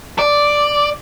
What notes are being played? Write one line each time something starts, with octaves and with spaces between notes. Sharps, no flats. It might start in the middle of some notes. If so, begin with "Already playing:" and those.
D5